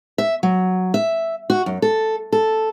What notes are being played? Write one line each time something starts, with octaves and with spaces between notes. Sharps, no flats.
E5
F#3
E5
F#4
F#2
A4
A4